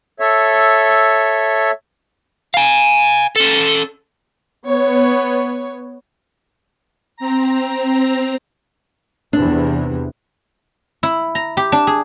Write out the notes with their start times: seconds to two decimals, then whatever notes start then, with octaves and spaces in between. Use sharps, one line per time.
0.20 A4 C#5 E5
2.54 F5 G#5
3.36 C#4 A4
4.66 B3 C#5
7.17 C4 A#5
9.33 E2 C3 E3 D4
11.03 E4
11.35 A#5
11.57 G4
11.72 D4
11.87 G#4